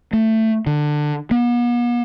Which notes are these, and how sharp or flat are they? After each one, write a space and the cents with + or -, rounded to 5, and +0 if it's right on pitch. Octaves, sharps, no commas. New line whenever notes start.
A3 +15
D3 +15
B3 -45